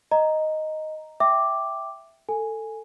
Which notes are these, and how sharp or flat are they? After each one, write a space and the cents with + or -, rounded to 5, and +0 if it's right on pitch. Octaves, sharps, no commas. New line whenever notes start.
D#5 +0 A#5 +0
E5 +0 G5 +0 D6 +0
A4 +15 G#5 +0